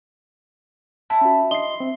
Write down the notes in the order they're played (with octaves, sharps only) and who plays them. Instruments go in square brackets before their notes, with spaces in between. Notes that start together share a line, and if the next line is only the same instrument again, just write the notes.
[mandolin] E4 [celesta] A5
[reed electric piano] C#4 F#4
[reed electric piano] D4 D#5 C6 [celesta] C7 G7
[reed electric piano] C4